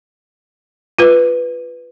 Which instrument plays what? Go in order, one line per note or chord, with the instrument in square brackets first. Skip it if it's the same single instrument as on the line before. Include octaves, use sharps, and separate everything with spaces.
[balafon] F4 B4